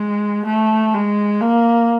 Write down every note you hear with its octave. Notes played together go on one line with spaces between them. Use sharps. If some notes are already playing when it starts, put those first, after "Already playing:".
Already playing: G#3
A3
G#3
A#3